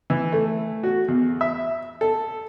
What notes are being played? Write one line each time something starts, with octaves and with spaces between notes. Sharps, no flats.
E3
A3
F#4
E2
E5
A4